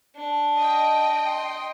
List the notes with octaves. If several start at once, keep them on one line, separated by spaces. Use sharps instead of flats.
D4
D#5 G5
C6